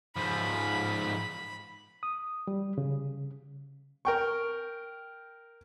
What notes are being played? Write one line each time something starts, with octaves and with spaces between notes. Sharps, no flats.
G#2 F3 B5
D#6
G3
C#3
A#4 G5 C#6